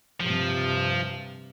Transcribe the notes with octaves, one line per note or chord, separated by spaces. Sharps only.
G2 C3 F3